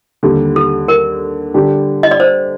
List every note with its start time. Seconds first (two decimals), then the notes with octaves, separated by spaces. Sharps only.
0.23 D#2 D3 G3
0.56 A4
0.88 A#4
1.54 D3 G3 D4 G4
2.03 D#5
2.11 D5
2.20 C5